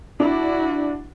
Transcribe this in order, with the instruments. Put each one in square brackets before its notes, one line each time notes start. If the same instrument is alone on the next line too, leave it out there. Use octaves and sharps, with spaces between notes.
[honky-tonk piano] D4 [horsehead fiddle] E4 F#4